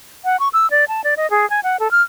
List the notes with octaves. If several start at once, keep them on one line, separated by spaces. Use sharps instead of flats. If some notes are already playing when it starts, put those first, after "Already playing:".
F#5
C#6
E6
D5
A5
D5
D#5
G#4
G#5
F#5
A4
F6